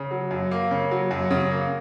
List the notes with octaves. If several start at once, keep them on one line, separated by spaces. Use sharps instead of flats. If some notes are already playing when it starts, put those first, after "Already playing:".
Already playing: C#3
F#3
F#2
A#3
C#3
F#3
F#2
C#3
A#3